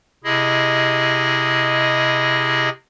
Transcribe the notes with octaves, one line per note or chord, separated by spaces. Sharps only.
C3 E4 G#4 D#5